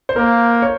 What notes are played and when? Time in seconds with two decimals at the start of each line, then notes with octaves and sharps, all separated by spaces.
0.09 C5
0.16 A#3 A#4
0.62 C#5